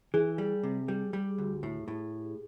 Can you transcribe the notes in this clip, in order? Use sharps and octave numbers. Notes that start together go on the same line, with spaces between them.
E3 G#4
G3
C3
G3 G4
G3
D2
A2
A2